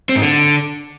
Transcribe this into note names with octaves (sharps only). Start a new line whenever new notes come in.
C4
G#2
D3